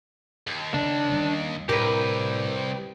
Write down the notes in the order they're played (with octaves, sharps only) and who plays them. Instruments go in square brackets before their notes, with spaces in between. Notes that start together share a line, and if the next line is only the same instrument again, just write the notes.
[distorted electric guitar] D#2
[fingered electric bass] C#3 [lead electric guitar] D4
[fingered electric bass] D#3 G3 C#4
[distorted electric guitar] C2 [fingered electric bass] A2 [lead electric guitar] G4 B4 [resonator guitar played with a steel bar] A#4